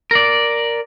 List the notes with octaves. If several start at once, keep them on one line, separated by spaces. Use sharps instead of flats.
A#4 D5